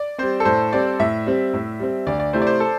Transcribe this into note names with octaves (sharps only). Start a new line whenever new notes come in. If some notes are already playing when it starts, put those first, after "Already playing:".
Already playing: D5
G3 C4 C5
A4
A2 C5
G3 C4 D5
A2 E5
G3 C4
A2
G3 C4
D2 D5
D5
C3 A3 E4 C5
D5
C5
A4